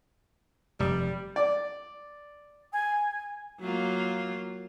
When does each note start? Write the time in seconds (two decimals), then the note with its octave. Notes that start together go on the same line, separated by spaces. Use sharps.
0.80 F1 G3
1.36 D5
2.72 G#5
3.61 F#3 A#3 F4